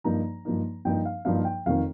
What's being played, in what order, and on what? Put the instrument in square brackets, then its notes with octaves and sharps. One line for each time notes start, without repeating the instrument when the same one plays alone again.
[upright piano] G2 F3 A#3 D#4 A#5
G2 F3 A#3 D#4
G2 F3 A#3 D#4 G5
F5
G2 F3 A#3 D#4 F5
G5
F1 F2 D#3 F5